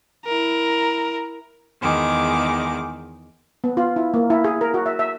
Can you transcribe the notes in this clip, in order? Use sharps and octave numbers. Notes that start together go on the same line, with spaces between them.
E4 A#4
E2 D#3 G#3 D6
B3
F4
E4
A#3
E4
G#4
A#4
F#4
E5
E5